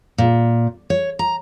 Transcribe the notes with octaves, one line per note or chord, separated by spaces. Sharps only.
A#2
C#5
A#5